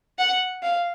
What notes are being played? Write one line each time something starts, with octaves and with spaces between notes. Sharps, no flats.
F#5
F5